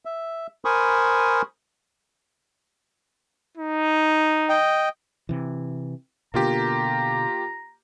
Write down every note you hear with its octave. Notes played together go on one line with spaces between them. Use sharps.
E5
A#4 C5 G#5 B5 C#6 D#6
D#4
D#5 G5
C3 E3
B2 D3 A#3 F4 G4 A#5